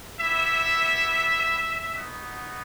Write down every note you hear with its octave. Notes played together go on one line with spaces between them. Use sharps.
B3 E4 G4 E5
B3 D#4 F#4